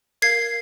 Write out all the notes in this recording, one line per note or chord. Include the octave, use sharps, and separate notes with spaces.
A#4 F5 G#6 C7